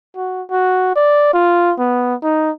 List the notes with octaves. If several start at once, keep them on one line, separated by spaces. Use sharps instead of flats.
F#4
F#4
D5
F4
B3
D#4